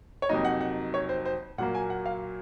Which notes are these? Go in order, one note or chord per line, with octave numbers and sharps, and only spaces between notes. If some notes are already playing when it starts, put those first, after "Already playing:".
C#5
F2 C3 F#3 A#3 D#4 D#5
F#5
F#5
C#5
C5
C5
A#2 F#3 A#3 F#5
G#5
F#5
F5